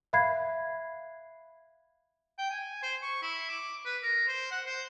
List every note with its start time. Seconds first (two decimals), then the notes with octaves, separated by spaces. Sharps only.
0.13 E5 F5 B5 F#6 G#6 C7
2.38 G5
2.50 G#5
2.83 C5
3.02 C#6
3.22 E4
3.49 D6
3.85 B4
4.02 A#4
4.28 C5
4.51 F#5
4.66 C5